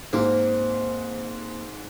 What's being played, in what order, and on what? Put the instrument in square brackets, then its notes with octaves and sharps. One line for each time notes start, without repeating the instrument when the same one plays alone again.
[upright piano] G#2 [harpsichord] A#3 [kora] C4